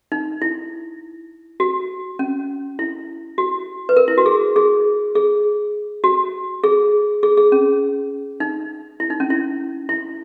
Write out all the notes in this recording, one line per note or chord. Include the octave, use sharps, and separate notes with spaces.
D#4
E4
F#4
C#4
E4
F#4
B4
A#4
E4
F#4
G#4
G#4
G#4
F#4
G#4
G#4
G#4
C#4
D#4
E4
D#4
C#4
E4
E4